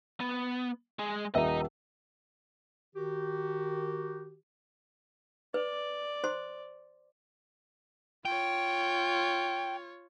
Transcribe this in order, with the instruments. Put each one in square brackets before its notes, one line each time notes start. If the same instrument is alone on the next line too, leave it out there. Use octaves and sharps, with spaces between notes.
[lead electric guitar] B3
G#3 G#4
[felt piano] D#1 E5 [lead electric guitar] D#5 A#5
[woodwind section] D#3 F#4 G4
[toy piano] B4 [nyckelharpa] D5
[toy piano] C5 C6
[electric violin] F4 C#5 [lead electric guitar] G5